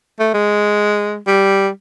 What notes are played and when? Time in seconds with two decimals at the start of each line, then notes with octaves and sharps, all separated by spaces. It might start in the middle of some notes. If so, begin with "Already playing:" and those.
0.19 A3
0.34 G#3
1.27 G3